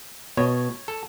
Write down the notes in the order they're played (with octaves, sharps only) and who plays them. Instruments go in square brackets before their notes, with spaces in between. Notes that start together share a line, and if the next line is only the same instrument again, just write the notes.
[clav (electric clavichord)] B2 [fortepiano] C#5
[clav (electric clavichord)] A4